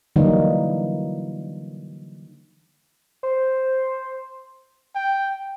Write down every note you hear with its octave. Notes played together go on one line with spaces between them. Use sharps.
D3 E3 F#3 G3 A#3 D#4
C5
G5